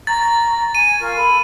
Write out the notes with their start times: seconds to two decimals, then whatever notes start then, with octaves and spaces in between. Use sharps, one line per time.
0.07 A#5 C#6 A6
0.75 G#5 D#7
0.99 F4 A#4 C#6
1.17 A4 B5